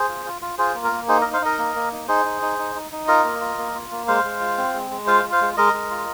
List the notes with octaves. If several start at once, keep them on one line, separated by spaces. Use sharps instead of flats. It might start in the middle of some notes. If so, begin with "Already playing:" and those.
Already playing: G#4 C5
F4
F4
F4
F4 G#4 C5
A#3
A#4
A#3
D#4 G#4 C5
A#4 D#5
D#4
C5 F5
D#4 A#4 D#5
A#3
A#3
D#4
D#4 G#4 C5
D#4
D#4
D#4
D#4
D#4
F4 A#4 D#5
A#3
F4
A#3
F4
A#3
G#3 C5 F5
G#3
F4
C4
G#3
G#3
F4 C5 F5
F4
C5 F5
G#3
G#3 A#4 D#5
G#3
F4